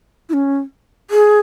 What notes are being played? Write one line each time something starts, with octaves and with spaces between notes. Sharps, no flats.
E4
C#4
G#4